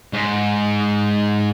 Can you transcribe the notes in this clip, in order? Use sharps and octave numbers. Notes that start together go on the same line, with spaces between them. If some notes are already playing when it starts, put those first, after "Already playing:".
G#2